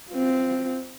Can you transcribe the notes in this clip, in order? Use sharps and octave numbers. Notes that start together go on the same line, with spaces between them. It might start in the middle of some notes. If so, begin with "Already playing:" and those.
C4 F4